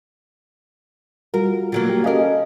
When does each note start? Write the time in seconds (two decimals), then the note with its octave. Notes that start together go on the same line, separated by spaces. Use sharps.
1.34 G3 F4 F#4 A#4
1.72 D3 F#3 A#3
1.90 F#4 G4
2.04 C#4 A4 A#4 D#5 F5